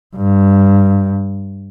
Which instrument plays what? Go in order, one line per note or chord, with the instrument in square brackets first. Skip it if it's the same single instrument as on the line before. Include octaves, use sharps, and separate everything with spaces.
[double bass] G2